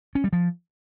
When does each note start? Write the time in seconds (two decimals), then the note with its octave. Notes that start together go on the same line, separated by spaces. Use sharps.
0.15 C#4
0.24 G3
0.33 F3